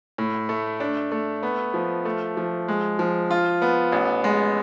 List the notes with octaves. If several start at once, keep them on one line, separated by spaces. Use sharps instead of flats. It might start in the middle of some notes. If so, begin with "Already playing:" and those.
A2
A3
D4
A3
B3
F3
A3
F3
G#3
F3
F4
B3
A1
G#3